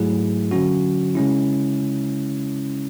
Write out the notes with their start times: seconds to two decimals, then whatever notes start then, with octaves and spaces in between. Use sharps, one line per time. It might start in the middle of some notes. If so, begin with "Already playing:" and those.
Already playing: G#2 F#3 A3 E4 G#4
0.51 D3 F#3 C#4 F#4
1.15 C#3 G#3 C#4 E4